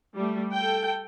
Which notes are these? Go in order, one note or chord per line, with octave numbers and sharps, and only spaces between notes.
G3 A3
A4 G5